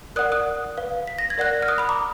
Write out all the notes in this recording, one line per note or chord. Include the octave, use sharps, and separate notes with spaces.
A#4 D5 F#5 D#6 F#6
D#6 F#6
B4 F5
B6
A#6
G#6
A#4 D5 F#5 F#6 A#6
F6
D#6 F#6
B5 D#6
A#5 D6